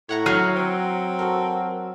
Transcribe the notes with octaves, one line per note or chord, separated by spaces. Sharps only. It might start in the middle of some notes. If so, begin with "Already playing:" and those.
A2 C#5 F#5 A#5
F#3 F6 C7 D#7
C4
F#4 A4 A#4